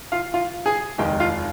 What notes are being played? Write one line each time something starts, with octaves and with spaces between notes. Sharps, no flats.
F4 F5
F4 F5
G#4 G#5
F1 D#2 D#3 G#3 G4 G5
F4 F5